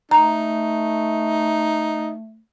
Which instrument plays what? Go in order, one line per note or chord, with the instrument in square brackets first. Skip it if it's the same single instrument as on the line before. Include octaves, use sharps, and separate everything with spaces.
[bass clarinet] A3 [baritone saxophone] D#4 [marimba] A#5